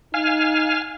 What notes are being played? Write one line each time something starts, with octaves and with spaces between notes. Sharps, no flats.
D#4 F5 G#5 F6